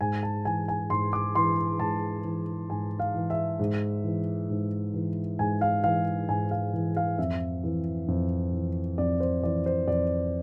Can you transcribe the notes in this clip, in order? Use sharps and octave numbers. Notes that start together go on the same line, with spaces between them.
G#2 G#5
A5
E3 G#5
G#5
G#2 C6
D6
E3 C6
G#2 A5
E3
G#2 G#5
F5
E3
E5
G#2
E3
G#2
E3
G#2 G#5
F5
E3 F5
G#2 G#5
F5
E3
F5
F2 E5
E3
F2
E3
F2 D5
C5
E3 D5
C5
F2 D5